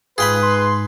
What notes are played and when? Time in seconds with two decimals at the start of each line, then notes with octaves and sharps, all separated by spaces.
0.18 G#2 F4 G#4 B4 G5 B5
0.43 C6